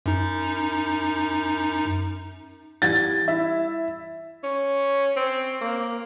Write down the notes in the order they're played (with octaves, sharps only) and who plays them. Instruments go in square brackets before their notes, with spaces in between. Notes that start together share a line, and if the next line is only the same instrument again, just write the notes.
[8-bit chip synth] F#2 D#4
[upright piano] E3 G3 G#6 [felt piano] A6
[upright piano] E4 E5
[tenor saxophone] C#4
C4
A#3